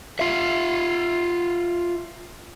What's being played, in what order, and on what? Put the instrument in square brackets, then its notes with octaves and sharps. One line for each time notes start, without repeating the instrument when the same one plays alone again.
[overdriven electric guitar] F4 E5